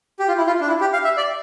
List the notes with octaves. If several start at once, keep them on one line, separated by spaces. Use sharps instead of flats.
G4
F4
E4
F4
D4
E4
G4
F5
E5
D5